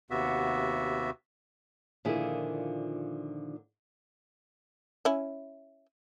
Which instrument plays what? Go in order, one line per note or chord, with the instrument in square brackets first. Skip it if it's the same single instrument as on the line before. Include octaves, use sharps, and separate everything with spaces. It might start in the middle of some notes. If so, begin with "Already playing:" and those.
[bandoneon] D#2 C3 B3 F#4 E5
[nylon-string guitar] A#2 D3 D#3 F3 E4 G#4
[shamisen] C#4 E4